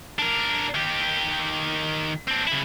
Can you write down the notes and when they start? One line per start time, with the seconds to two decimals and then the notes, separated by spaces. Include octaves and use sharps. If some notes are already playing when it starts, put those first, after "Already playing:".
0.19 D4 A#4
0.75 D#3 G4
2.28 C4 D4
2.47 C#3 E4